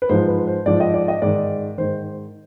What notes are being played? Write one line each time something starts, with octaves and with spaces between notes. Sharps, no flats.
B4
G#2 F3 C5
B4
C5
G#2 F3 D5
D#5
D5
D#5
G#2 D#3 D5
G#2 D#3 C5